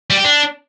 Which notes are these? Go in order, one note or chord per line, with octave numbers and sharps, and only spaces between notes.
G3
G4
D4